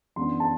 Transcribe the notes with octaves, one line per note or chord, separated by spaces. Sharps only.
F#2 E3 B3 D4 C6
A5